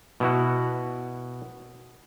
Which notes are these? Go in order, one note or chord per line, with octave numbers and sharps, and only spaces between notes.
B2 E4 F#4